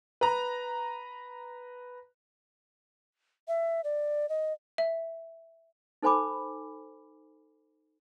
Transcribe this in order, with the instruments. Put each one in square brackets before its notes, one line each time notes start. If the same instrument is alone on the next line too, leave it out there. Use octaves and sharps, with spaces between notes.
[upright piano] B4 A#5
[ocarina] E5
D5
D#5
[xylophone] E5
[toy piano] D#4 A4 C5 G#5 B5 D6